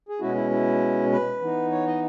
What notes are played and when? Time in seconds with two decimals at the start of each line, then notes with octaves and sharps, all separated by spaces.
0.09 G#4
0.20 B2 G#3 C#4 E4 F#4
0.35 E4
0.50 E4
1.12 B4
1.41 E3 B3 D#4
1.71 C#5
1.87 D#5